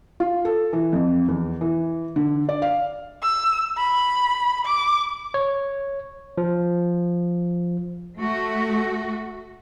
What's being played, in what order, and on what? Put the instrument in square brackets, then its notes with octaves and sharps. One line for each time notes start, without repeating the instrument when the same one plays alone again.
[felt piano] F4
A4
E3
F2
E2
E3
D3
D5
F5
[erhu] E6
B5
D6
[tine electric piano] C#5
F3
[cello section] A3 F#4